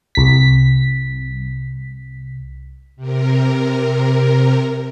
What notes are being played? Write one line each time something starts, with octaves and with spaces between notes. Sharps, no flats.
C2 B6
C3 A#4